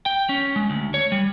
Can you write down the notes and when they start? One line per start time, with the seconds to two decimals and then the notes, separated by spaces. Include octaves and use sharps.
0.06 G5
0.29 C#4
0.56 G#3
0.70 D2
0.94 C#5
1.12 G3